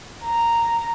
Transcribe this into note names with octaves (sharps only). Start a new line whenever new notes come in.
A#5